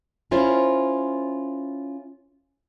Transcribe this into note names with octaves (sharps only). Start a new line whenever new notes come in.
C#4 E4 F4 A#4 C5 C#5